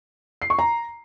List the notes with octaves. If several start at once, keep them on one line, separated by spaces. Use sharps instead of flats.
C7
C#6
A#5